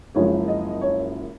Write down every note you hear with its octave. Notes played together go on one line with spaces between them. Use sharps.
F#1 F#2 F3 G#3 C#5
D#5
C#5